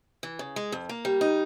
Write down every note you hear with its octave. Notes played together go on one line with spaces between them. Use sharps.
E3
C#3
G#3
F2
A#3
G3
D#4